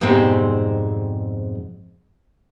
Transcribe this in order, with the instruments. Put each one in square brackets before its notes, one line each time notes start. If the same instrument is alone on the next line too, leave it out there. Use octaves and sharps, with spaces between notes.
[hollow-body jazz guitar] F2 G#2 B2 G3 G#3 C4